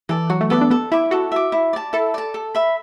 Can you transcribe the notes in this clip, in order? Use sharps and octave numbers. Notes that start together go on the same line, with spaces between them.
E3 A4 D5
F#3 F#4
A3
B3 A4 D5
D4
B3 A4
E4 E5 D6
F#4 A4
E5 D6
E4
D5 A5
E4 A4
D5 A5
A4
E5 B5